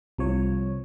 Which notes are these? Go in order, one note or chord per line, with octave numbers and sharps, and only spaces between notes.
C2 F3 C#5